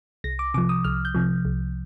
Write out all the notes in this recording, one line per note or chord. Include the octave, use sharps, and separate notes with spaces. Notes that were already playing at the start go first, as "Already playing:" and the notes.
C2 A#6
D6
C3 F3 D6
D#6
C2 F6
G6
C3 F3
C2